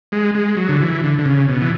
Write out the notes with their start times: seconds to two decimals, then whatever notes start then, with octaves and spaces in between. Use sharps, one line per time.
0.12 G#3
0.35 G#3
0.57 F#3
0.69 D3
0.80 E3
1.04 D3
1.19 D3
1.26 C#3
1.49 B2
1.62 E3